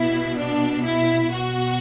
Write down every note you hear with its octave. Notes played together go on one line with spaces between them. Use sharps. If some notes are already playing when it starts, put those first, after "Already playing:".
Already playing: B2 E4
D4
E4
B2 F#4